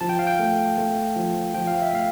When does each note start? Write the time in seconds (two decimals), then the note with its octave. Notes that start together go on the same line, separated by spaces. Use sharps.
0.01 F3 A5
0.09 G5
0.19 F5
0.27 G5
0.39 A3
0.78 A3
1.16 F3
1.54 F3 G5
1.67 F5
1.82 E5
1.93 A3 F5